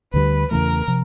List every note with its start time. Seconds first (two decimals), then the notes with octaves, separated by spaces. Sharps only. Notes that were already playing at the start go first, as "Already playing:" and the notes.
0.13 D2 D3 G3 B4
0.51 E2 C#3 E3 A3 A#4
0.88 C3 F3